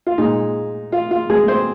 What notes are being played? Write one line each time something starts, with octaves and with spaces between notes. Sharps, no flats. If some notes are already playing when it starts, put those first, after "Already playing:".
F4
A#2 G#3 D#4
F4
F4
G#3 G#4
C4 C5